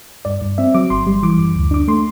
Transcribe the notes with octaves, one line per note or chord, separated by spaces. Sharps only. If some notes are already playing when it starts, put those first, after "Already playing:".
G2 D5
G2
C4 E5
F#3 D6
G1 C6
G3
E3 D6
F#2
D2
D4 D6
A3 C6